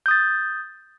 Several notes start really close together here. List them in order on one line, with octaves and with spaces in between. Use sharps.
G6 D#6 A6